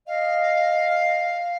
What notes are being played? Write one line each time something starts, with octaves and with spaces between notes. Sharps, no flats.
D#5 F5